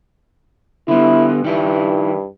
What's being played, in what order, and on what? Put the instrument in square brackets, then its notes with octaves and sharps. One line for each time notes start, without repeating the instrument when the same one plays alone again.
[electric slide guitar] D3 B3 [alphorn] E4
[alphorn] G2 [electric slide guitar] D#3 E4